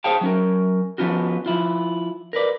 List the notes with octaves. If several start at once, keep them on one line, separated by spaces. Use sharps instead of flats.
G#4 C5 C#5 F5 G5 A5
F#3 C#4 A#4
F3 B3 C#4 F4 F#4
F3 E4 F4
A#4 B4 D5